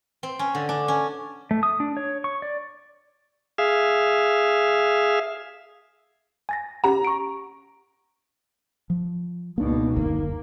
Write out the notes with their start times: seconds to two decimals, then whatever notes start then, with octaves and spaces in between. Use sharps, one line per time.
0.23 C4
0.39 C#4
0.55 D3
0.69 D4
0.88 C#4
1.51 A3
1.63 D#6
1.80 D4
1.97 C#5
2.24 C#6
2.42 D5
3.58 G#4 E5 F5
6.49 G#5 A6 A#6
6.84 C#4 G4 F#5 A#5
7.05 C#6 D7
8.90 F3
9.58 C#2 B2 A#3 D4 D#4
9.96 F#1 D#2 D3 A#3